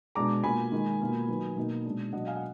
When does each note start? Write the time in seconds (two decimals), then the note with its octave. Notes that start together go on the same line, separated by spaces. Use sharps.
0.15 B2 G#3 D4 A#5 D6
0.44 B2 A#3 F4 G#5 B5
0.72 D#3 G#3 D#4
1.00 B2 A#3 F4
1.28 D#3 F#3 B3
1.56 B2 A#3 D#4
1.85 B2 G#3 D4
2.13 B2 F#3 D4 D#5 F#5
2.27 F5 G#5
2.36 F#5